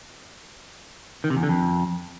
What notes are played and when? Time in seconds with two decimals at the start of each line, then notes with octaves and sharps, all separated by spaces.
1.24 D#3
1.30 C3
1.37 E2
1.43 D3
1.49 F2